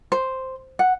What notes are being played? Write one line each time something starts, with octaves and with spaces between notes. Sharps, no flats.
C5
F#5